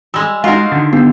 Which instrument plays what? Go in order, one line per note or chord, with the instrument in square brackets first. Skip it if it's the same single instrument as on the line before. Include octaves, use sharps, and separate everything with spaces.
[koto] G3 G#3 [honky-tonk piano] E6
[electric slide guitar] G#3 [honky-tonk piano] D#4 F#4 F5 [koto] F4 A#4
[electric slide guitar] D3 D#3
[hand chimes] B3 [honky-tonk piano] G4